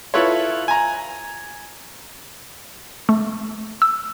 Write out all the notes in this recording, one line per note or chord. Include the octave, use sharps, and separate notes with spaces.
E4 F4 A4 B4 C#5
G#5 A#5
A3
E6